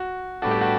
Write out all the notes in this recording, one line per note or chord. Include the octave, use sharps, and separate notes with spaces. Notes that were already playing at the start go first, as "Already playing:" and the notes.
Already playing: F#4
A2 G3 B3 D4 F#4 A4
G4
F#4